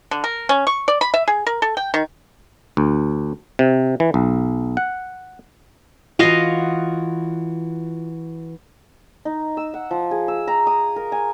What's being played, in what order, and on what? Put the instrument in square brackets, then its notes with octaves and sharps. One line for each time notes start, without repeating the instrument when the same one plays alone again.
[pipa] D3
A#4
C#4
C#6
D5
B5
E5
G#4
A#4
A4
G5
D#3
[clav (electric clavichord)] D2
C3
E3
B1
F#5
[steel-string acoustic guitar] E3 F#4 [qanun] F4 D#5 F5
[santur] D#4
E6
F#5
F3
G#4
E6
A#5
D#6
A#4
G#5